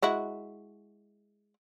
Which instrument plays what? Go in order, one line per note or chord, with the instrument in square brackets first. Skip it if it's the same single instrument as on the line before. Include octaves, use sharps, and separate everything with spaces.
[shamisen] G#3 E4 F#4